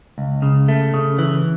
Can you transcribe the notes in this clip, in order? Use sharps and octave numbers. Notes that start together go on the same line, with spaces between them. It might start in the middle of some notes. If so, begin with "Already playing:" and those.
C#2
C#3
A3
C#3
E3